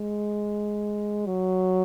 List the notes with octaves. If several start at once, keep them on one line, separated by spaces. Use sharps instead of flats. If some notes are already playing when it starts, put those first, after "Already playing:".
Already playing: G#3
F#3